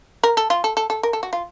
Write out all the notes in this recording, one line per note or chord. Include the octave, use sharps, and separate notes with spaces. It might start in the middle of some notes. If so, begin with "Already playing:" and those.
A#4
A4
F4
A4
A4
A4
A#4
A4
F#4
F4